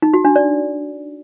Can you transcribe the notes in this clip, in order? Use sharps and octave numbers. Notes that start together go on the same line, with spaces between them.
D#4
F#4
D4
D5